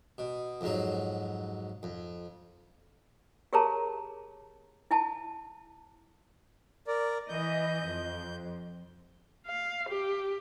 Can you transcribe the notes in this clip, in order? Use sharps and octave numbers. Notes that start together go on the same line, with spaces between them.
B2
F2 G#2 F#3
F2
G4 G#4 A#4 C#5 A5 A#5
E4 G#5 A5
A#4 D5
E3 D#5 G6
F2
F5
G4